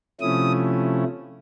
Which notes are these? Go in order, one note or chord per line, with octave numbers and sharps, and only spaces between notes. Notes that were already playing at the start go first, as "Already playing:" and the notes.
C3 F3 A3 C#4 E4 D#6